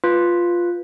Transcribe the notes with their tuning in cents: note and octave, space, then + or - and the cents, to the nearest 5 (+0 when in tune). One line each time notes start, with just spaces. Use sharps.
F4 +0 B4 +0